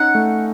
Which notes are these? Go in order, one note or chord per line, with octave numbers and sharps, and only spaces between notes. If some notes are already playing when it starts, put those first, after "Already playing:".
Already playing: C#4 D#4 F#5
A3